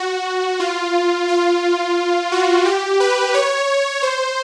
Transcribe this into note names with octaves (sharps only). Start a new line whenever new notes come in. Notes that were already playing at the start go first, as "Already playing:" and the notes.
Already playing: F#4
F4
F4
F#4
G4
B4
C#5
C5